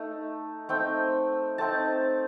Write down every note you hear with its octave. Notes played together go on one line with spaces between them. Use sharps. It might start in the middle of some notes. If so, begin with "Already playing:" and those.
Already playing: A3 D#4
A3 C4 D#4 G5
A3 C4 D#4 A5